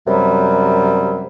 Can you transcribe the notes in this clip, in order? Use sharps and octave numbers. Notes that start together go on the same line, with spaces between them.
F#2 C3 F#3 G3